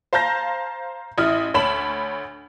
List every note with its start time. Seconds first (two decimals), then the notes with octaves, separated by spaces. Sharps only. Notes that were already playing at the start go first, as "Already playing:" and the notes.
0.13 C5 F5 A5 A#5 G6 A#6
1.18 A1 E4 D#6 F6
1.54 D2 C#5 A5 B5 E7 F#7